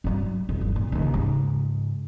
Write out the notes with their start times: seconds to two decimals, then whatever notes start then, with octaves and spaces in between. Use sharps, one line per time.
0.04 G2 F#3
0.49 B1 E2
0.61 G1
0.76 A#2
0.92 D#2 C#3
1.14 G#2 C#3